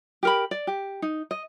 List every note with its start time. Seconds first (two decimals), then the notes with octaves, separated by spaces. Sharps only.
0.23 G4 A#4 B5
0.51 D5
0.67 G4
1.02 D#4
1.31 D#5